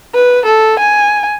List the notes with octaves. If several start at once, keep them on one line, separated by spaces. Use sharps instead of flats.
B4
A4
G#5